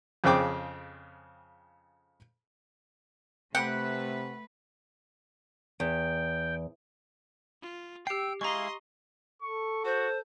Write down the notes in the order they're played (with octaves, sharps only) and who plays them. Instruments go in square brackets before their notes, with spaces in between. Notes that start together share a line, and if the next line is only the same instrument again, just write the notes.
[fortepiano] F2 C#3 C4 G#4 G5 D6
[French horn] C3 [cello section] A3 B4 [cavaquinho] F#5 [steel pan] G5
[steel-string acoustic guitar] E2 [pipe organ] G5
[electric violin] F4
[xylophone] G4 C7 [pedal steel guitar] G5 E6 [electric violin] D7
[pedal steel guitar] G#3 E4 F5 [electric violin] D#5 C6 [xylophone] A#5 C#6
[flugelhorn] A4 [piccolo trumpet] C#6
[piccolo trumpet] F#4 [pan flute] C5